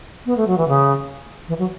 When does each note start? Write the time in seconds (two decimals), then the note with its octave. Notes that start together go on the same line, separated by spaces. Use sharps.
0.26 B3
0.37 A3
0.47 F#3
0.57 E3
0.68 C#3
1.48 E3
1.59 F#3